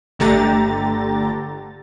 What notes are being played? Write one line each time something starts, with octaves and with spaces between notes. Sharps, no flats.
G1 D3 A3 G4 A#5 A6